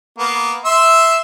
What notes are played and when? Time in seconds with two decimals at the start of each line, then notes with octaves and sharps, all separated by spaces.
0.18 A#3 B3
0.65 E5 C6 E6